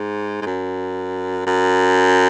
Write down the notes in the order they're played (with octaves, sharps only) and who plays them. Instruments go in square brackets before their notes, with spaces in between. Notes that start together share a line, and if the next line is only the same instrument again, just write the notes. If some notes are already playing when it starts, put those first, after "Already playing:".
Already playing: [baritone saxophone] G#2
G#2
F#2
F#2